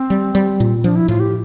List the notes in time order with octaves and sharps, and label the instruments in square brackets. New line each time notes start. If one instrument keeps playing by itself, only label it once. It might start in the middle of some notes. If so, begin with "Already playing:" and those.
Already playing: [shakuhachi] C4
[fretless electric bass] G3
G3
A#2
[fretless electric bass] F3 [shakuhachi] D4
[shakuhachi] E4
[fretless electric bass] A2 [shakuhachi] F4
[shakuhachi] G4